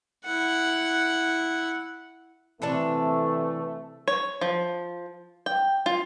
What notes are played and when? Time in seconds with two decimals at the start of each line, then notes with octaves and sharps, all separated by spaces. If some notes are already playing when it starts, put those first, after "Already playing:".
0.25 E4 F#5
2.62 C3 E3 A3 D4 A4 B4
4.08 C#5
4.41 F3
5.46 G5
5.86 F4